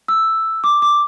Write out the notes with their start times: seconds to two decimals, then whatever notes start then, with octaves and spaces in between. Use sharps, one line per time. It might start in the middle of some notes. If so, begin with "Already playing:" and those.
0.08 E6
0.64 D6
0.82 D6